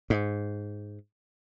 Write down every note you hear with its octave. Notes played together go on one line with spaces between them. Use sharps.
G#2